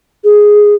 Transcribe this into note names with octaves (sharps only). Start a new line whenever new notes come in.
G#4